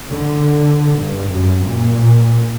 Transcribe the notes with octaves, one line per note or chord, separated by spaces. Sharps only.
D3
G2
F#2
A#2